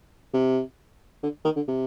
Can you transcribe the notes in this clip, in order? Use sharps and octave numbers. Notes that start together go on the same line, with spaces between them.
C3
D3
D#3
D3
C3